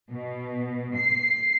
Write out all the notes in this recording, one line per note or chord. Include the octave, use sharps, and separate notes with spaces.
B2
C7